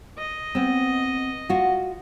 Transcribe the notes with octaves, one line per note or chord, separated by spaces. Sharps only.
D#5
B3 C4
F4 F#4